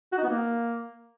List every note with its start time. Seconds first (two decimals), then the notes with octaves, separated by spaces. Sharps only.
0.12 F#4
0.18 D#4
0.23 B3
0.29 A#3